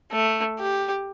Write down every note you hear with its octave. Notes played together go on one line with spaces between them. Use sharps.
A3
G4